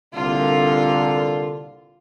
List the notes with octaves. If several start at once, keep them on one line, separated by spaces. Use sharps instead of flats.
C2 A#2 D3 F4